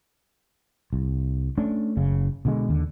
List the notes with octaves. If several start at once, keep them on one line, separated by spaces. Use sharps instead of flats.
C2
A3 C#4 D4
F#1 C#3
B2 D3 G#3
D#2 D3